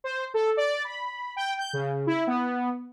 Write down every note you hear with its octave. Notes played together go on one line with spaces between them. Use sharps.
C5
A4
D5
B5
G5
G6
C#3
E4
B3